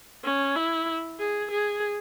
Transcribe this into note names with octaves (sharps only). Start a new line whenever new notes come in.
C#4
E4
G#4
G#4